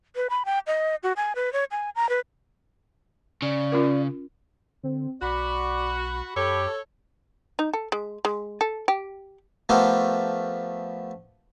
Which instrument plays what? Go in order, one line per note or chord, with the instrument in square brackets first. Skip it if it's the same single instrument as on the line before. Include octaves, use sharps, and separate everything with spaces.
[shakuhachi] B4
B5
G5
D#5
F#4
G#5
B4
C#5
G#5
A#5
B4
[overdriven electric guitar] C#3 [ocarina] D5
[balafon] C#4 F4 A#4
[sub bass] D3 [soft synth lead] C4
[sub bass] B1 [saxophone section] F#4 [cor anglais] D5 [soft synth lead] B5
[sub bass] F#2 [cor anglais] G4 [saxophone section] A4 C#5
[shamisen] D#4
A4
G#3
G#3
A4
G4
[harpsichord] F3 A3 B3 G4 A4 A#4